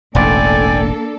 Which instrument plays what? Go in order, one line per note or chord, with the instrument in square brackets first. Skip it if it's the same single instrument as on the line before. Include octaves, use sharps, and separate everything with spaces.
[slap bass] E1 A1 [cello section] A#3 D4 A4 [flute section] D5 G5 G#5